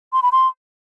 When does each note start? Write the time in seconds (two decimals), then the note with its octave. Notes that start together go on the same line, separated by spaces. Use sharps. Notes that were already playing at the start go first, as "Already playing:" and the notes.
0.13 C6
0.22 B5
0.32 C6